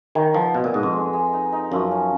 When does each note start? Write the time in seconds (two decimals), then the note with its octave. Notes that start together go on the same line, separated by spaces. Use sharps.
0.15 D#3 C#5
0.34 F3 B3
0.54 B2 D#5
0.64 A#2
0.74 G#2 D#5
0.83 F2
0.93 G#3
1.13 G#3
1.33 D#4
1.52 D#4
1.72 F#2 F3
1.91 C#4